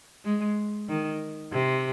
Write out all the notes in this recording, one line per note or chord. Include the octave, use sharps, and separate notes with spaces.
G#3
D#3
C3